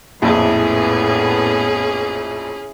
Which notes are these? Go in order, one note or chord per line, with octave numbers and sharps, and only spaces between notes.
A#1 F2 A2 B3 C#4 E4 G#4